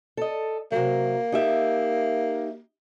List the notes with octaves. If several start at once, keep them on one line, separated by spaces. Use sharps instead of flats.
A4 D#5
C3 F#3 A#3
D#4 G4 E5